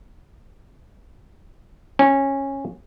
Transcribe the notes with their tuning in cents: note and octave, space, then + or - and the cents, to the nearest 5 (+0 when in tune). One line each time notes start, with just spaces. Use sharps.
C#4 -15